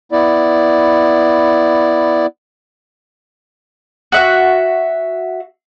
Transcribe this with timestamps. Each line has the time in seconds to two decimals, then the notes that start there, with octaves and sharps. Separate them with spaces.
0.12 B3 E4 D5
4.12 F#4 E5